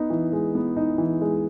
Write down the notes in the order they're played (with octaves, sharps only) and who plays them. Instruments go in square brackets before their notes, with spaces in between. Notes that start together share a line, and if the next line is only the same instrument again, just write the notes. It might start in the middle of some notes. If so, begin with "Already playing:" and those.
Already playing: [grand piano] B3 D#4
E3
G#3
B3
D#4
E3
G#3